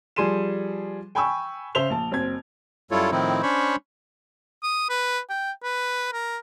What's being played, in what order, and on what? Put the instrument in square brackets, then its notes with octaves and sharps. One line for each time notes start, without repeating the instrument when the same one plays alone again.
[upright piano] F3 G3 G#4 C6 D#7 E7
G5 G#5 B5 C#6 E6
C#3 C5 E5 C6 F7 G7
A#1 A5
F#1 C4 G#6
[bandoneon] F#2 G3 E4 F4 A4 C#5
A2 D#3 F3 C4 D#4 E4
C#4 D4 C5 C#5 B5 C#6
[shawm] D#6
B4
G5
B4
A#4